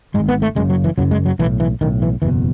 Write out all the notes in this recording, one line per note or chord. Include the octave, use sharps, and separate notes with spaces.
G#1 G#2 G#3
B3
A3
F#1 F#2 C#3 G#3
F#3
E3
F#1 F#2 C#3 F#3
G#3
F#3
B1 A2 E3
E3
B1 A2 D#3
E3
F#1 E2 B2 E3